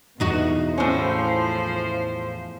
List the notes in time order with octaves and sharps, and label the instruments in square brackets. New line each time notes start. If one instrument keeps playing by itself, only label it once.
[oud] E2 D#4 F#4 [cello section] B2
[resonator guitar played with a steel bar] A2 C#4 [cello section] F3 C5